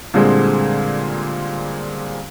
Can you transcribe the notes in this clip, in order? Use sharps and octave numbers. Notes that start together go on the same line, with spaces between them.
A#2 D3 G3 G#3 C4